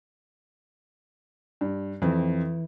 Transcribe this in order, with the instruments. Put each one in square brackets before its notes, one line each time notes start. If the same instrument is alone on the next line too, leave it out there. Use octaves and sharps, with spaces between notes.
[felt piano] G2
[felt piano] F2 C4 [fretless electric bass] E3